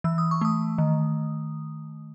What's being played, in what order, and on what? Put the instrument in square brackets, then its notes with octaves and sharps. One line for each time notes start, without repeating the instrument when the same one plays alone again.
[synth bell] E3 E6
D#6
C#6
A3 D#6
D#3